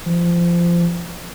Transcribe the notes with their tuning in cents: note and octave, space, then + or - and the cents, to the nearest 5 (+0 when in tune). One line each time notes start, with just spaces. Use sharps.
F3 -20